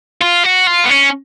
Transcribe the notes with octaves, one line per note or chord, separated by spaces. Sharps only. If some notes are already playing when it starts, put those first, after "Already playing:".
F4
F#4
F4
B3
C#4